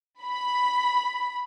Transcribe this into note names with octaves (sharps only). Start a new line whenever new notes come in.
B5